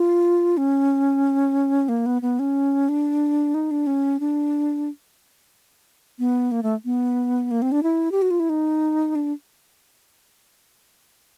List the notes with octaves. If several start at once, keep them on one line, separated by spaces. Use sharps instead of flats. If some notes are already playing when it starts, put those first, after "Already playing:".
Already playing: F4
C#4
A#3
B3
B3
C#4
D4
D#4
D4
C#4
D4
B3
A#3
A3
B3
A#3
C4
D4
E4
G4
F#4
F4
E4
D#4
D4